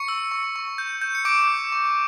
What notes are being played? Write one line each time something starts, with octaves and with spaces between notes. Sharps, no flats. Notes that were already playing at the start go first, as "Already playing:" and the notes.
Already playing: C#6 C#7
E6
C#6
C#6
G6
G6
C#7
D6 G6 D7
G6
C#6